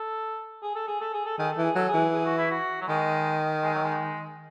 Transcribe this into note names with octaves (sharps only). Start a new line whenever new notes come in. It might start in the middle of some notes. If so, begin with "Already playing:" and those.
Already playing: A4
G#4
A4
G#4
A4
G#4
A4
D#3 G#4
A4
E3
G#4
F#3 A4
G#4
E3
G#4
F#4
E4
F#4
F#3
D#3 G#3
G#3
F#3
G#3